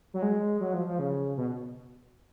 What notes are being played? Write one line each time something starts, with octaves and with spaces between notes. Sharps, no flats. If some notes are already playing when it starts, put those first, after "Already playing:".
F#3
G#3
F#3
F3
F3
C#3
B2